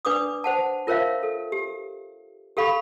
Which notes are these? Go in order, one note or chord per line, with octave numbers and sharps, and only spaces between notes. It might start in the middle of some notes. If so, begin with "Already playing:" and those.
D4 B4 D5 D6 D#6
C5 F#5 A5
F4 A#4 C5 C#5 E5 F5
A4
G4
G4 A4 F5 B5 C#6